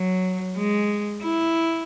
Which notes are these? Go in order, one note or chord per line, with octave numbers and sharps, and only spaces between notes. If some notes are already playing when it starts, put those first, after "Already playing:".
Already playing: F#3
G#3
E4